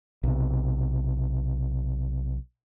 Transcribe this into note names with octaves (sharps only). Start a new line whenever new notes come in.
B1 C3